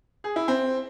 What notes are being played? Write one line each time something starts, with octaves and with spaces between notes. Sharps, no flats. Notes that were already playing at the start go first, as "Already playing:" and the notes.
G#4
E4
C4